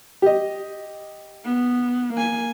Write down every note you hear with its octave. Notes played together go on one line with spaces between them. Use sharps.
G4 D#5
B3
A#3 G#5